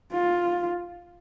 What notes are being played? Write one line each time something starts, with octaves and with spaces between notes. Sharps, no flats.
F4